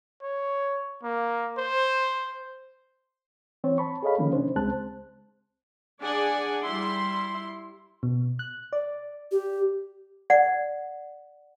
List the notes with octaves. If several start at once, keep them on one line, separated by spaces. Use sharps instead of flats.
C#5
A#3
C5
E3 C4 C#5
A5 B5 C#6
G#4 A4 C#5 D#5 F5 B5
D3 D#3 F3 A#3 C#4 D#4
C3 C#4 D4 C5
C#2 G#3 C4 C5 A5 F#6
D4 G#4 D5 F#5 G#5
G3 E4 C6
B2
F#6
D5
G4
D5 F#5